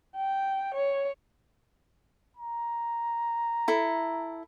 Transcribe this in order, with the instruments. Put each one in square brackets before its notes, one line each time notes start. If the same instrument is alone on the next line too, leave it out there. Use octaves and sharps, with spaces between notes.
[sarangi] G5
C#5
[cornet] A#5
[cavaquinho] E4 A4